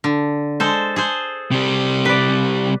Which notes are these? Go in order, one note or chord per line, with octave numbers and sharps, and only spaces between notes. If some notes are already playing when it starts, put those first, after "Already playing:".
D3
G#3 A4 C5
G#4 A4 C5
C3 G3
B4 D5